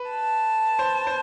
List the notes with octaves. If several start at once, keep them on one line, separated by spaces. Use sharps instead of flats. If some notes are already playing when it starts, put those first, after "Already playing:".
Already playing: B4
A5
C5
C5